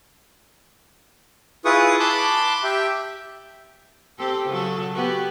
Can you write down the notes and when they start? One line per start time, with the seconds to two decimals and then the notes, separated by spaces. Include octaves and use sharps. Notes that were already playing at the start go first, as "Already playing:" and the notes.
1.65 E4 F4 G#4 B4 C#6 D#6
2.00 A5 B5 C6 D6 F#6
2.63 G4 E5 G5
4.18 C4 G4 A4
4.48 C#3 F#3 A4
4.94 B3 F#4 G4